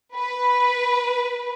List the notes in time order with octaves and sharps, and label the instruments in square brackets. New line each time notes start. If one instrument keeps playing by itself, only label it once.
[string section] B4